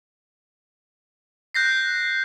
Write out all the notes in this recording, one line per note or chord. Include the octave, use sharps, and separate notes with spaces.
F#6 G6 A#6 C7